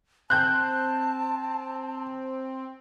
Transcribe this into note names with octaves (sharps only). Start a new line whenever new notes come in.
C4 A5 F#6 G6